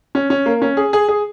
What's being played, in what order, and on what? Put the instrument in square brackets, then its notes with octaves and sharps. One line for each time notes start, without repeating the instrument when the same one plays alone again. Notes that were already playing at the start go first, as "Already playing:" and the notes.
[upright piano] C#4
C#4
A#3
C#4
G#4
G#4
G#4